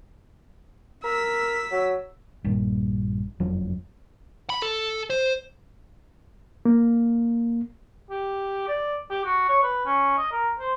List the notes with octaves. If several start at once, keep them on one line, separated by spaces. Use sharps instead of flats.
A#4 E6 B6
F#3
A#1 G2
F#1 F2 F3 F#3
B5
A4
C5
A#3
G4
D5
G4
F#4
C#5
B4
C#4
D#5
A#4
C5